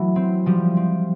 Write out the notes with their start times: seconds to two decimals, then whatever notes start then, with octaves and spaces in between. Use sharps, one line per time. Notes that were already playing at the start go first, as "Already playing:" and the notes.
Already playing: E3 F#3 A3 F#4
0.16 C4
0.46 F3 G3 G4
0.77 C4